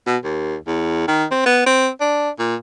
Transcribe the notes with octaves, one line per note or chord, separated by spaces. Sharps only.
B2
D#2
E2
D#3
C4
B3
C4
D4
A#2